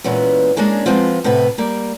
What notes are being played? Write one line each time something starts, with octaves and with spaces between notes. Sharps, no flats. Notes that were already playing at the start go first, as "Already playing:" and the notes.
A#2 E3 G#3 B3 C#4
G#3 A#3 C#4 D4 G#4
F3 G#3 B3 C4 F4
A2 C3 B3 B4
G3 A#3